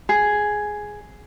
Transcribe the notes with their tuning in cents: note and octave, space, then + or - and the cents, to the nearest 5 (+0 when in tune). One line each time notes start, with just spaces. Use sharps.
G#4 +5